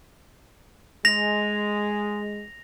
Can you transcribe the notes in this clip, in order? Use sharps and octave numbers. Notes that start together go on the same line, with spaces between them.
G#3 A#6 F7